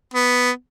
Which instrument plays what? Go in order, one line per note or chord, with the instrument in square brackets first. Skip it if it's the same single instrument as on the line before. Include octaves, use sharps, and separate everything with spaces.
[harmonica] B3